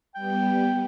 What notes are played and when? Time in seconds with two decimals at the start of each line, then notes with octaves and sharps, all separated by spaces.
0.15 G3 B3 G5